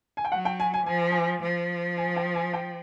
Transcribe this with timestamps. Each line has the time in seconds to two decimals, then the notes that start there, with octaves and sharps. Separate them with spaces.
0.17 G#5
0.25 G5
0.32 F#3 F#5
0.45 G5
0.60 G#5
0.74 G#5
0.86 F3 G#5
1.12 G#5
1.42 F3
1.97 G#5
2.16 G5
2.35 G#5
2.53 G5